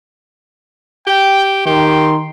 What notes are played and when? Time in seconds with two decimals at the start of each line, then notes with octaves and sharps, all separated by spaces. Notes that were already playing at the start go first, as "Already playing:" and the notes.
1.07 G4 G5
1.66 D#3 G4 C6